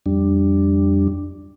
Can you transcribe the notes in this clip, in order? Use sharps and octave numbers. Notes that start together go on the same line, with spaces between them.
F2 G3 D4